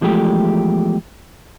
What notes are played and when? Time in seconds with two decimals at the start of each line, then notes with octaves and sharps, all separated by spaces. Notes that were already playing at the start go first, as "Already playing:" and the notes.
0.01 E2 F3 G#3 A3 G4